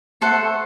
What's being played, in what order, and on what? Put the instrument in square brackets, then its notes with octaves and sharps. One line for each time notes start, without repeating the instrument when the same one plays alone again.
[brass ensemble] A3 [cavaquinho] A4 C5 F#5